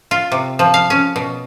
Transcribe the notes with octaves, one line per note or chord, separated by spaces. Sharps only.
F4
C3
F3
F5
C#4
B2